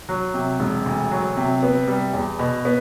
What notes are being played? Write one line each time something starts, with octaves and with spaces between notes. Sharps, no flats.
F#3
C3
E1
D2
F#3
C3
B3
G3
E2
B2
B3